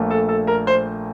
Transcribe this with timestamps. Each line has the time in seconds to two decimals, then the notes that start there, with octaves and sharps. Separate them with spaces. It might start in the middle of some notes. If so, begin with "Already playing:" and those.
Already playing: A#1 A#2 A3
0.11 A4
0.29 A4
0.47 A#4
0.67 C5